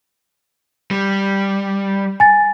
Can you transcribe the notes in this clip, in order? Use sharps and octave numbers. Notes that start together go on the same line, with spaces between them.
G3
G#5 A6